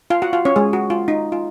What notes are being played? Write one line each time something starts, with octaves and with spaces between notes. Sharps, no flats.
F4 F5
F#4 F#5
F4 F5
C#4 C#5
G#3 G#4
F#4
F4
D#4
F4